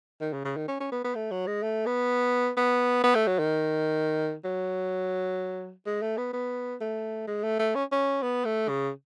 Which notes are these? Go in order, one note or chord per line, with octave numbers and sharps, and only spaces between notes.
D#3
C#3
C#3
D#3
C#4
C#4
B3
B3
A3
F#3
G#3
A3
B3
B3
B3
A3
F#3
D#3
F#3
G#3
A3
B3
B3
A3
G#3
A3
A3
C#4
C#4
B3
A3
C#3